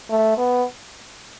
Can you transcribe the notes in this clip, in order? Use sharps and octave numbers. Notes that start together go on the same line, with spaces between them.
A3
B3